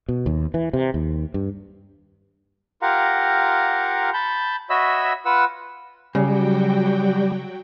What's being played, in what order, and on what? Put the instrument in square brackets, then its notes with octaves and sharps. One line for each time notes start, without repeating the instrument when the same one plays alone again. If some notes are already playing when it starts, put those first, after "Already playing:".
[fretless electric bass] B2
D#2
E3
C3
D#2
G2
[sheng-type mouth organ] F4 G4 A#4 F5 F#5 A#5
A5 B5 G6
F#4 C#5 D#5 E5 B5 E6
F4 B4 F#5 E6
[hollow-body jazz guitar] C#3 [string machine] F#3 F#4 G5 [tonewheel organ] G3